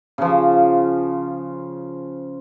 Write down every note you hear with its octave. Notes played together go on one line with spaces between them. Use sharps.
C#3 F3